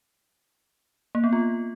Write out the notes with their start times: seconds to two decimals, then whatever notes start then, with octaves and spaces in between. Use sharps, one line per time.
1.15 A#3
1.24 B3
1.33 F4